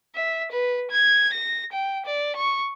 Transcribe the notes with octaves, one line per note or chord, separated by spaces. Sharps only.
E5
B4
G#6
A#6
G5
D5
C#6